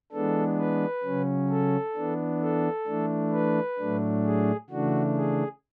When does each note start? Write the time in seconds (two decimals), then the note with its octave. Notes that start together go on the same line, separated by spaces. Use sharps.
0.12 E3 G#3 B3 D4 A4
0.58 B4
1.04 C#3 F#3 C#4
1.50 A4
1.95 E3 B3 D4
2.42 A4
2.87 E3 A3 D4
3.33 B4
3.78 A2 F#3 A3 D4
4.24 G#4
4.70 C#3 E3 A3 D4 F#4
5.16 G#4